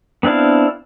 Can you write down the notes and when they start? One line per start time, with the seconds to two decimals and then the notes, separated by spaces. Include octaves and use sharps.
0.23 B3 C4 D4 E4 F5